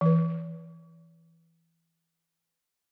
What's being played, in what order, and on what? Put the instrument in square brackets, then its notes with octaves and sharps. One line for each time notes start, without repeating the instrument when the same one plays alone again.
[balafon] E3 B4